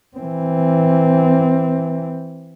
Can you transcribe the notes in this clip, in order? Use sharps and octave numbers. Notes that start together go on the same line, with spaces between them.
E3 C4